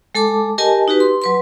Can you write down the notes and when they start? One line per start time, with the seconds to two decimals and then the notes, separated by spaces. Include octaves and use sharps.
0.15 G#3 A4 A5 D6
0.58 G4 A#4 D#5 G#5 A5
0.88 D#4 F#4 G4 B4
1.00 C6
1.22 F#3 B4 C6